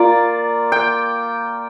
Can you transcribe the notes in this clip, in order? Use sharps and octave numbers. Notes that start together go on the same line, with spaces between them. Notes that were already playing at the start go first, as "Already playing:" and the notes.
Already playing: A#3 F4 D5
G5